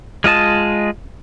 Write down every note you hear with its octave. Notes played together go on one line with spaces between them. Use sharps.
G#3 F4 D#5 A5